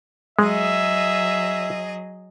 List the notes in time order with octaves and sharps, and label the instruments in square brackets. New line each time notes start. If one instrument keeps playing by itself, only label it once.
[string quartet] F#3 G#4 D#5 [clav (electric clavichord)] G#3 [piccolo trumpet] E5